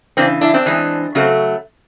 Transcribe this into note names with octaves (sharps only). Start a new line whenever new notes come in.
C#3 E3 C4 D4
D4 E4
C4 D4
E3 G#3 C4
C#3 F#3 A3 C4 C#4